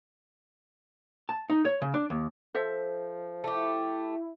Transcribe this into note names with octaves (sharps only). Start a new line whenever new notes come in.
A5
D#4
C#5
C#3
D4
D#2
F3 A4 C5 E5
A3 E4 G4